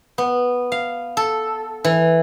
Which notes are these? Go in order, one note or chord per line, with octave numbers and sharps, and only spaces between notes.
B3
F5
A4
E3